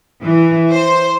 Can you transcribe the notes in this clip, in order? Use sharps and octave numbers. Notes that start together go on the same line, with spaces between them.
E3
C5